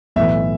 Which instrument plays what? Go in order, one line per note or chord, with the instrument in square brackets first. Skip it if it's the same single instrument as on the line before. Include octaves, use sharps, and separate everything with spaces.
[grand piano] B1 A2 E3 [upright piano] E5